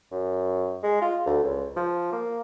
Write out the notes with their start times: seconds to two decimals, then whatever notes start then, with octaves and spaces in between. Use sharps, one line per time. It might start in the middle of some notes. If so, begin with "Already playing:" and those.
0.12 F#2
0.83 G#3
1.01 F4
1.26 D2
1.44 C#2
1.76 F3
2.12 A#3